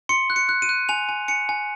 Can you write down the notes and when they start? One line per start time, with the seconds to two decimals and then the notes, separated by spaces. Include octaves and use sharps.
0.09 C6 C#7
0.30 F#6
0.36 C#7
0.49 F#6
0.62 D#7
0.69 F#6
0.89 G#5 F7
1.09 G#5
1.28 G#5 C#7
1.49 G#5